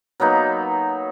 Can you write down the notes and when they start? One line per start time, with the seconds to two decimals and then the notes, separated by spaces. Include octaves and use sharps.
0.20 F#3 A#3 B3 D#4